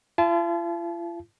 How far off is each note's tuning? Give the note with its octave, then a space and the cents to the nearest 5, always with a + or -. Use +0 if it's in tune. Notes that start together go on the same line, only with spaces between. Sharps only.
F4 -45 A5 -30